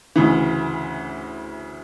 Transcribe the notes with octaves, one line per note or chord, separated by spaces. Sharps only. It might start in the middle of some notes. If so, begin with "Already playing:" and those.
D2 C#3 E3